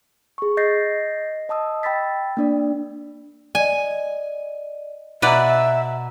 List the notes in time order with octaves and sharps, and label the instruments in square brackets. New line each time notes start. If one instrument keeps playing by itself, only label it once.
[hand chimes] G#4 C#6
D#5 G6 A6 A#6 C7
D#5 A5 D#6 E6
G5 B5 E6 A6 B6
A#3 D4 D5
[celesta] D5 D#5 [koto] G#5
[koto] B2 B4 D5 [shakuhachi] E5 [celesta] F#5 A#5